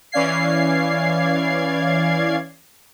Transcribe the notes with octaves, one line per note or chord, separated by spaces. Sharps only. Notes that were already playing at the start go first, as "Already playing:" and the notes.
E3 C#4 D5 F5 G#6 C7